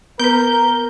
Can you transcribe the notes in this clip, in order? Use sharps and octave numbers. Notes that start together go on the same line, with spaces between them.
B3 A#4 B4 G6